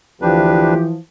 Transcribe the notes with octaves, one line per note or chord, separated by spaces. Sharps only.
D2 E3 F3 D4 G4 B4